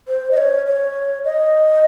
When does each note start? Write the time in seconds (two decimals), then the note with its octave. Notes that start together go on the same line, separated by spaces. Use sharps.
0.08 C5
0.31 D#5
0.37 C#5
0.66 C#5
1.25 D#5